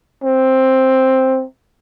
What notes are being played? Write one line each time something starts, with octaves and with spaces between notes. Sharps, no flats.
C4